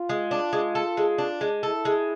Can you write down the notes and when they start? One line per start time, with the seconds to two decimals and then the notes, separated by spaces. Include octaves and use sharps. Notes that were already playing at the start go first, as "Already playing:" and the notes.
Already playing: F4
0.09 G#3
0.31 D4
0.53 G#3
0.75 A4
0.97 G#3
1.18 D4
1.41 G#3
1.63 E4 A4
1.85 G#3